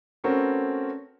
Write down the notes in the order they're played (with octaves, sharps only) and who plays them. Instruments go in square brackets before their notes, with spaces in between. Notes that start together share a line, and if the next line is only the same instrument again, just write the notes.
[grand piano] A3 C4 C#4 F#4 A#4 B4